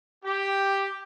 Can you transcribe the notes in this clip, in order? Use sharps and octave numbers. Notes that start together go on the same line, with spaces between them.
G4